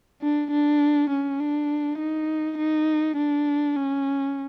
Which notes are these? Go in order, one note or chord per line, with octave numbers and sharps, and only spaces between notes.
D4
D4
C#4
D4
D#4
D#4
D4
C#4